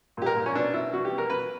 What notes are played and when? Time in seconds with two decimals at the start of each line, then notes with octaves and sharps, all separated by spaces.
0.17 A#2 G4
0.26 A#4
0.37 A#2
0.46 C#4
0.55 B2 D4
0.73 B2 E4
0.93 B2 F#4
1.05 G4
1.11 B2
1.18 A#4
1.30 B2 B4